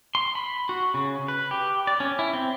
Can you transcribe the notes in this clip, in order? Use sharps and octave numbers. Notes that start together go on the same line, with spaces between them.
C6
B5
F#4
C#3
B4
G4
D5
C#4
E4
C4